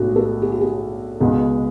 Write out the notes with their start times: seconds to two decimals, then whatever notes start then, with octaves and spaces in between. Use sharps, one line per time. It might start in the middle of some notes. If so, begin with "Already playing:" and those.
Already playing: B1 A2 G#3 D4 F#4
0.16 A4
0.42 G#4
0.52 F#4
0.61 G#4
1.20 C#2 B2 G#3